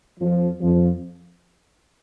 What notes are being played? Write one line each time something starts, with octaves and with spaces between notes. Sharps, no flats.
F2 F3
F2 F3